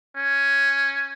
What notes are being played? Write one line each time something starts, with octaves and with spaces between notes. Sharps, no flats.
C#4